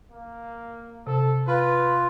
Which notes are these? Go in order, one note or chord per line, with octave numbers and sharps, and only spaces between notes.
A#3
C3 A4
F4 B4